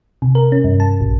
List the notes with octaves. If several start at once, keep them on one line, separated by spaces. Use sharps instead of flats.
C3
A#4
C#4
G2
A5
A#1